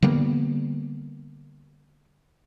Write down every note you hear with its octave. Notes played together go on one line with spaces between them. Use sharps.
D3 G3 A#3 B3